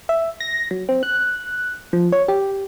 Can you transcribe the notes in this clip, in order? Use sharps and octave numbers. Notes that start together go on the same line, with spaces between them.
E5
A#6
F#3
C4
F#6
F3
C#5
G4